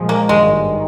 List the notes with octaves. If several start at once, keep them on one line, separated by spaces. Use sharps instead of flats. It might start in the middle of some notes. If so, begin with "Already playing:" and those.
Already playing: A#2 F3 G#3
A#3
G#1 G2 D#3 G#3
D#3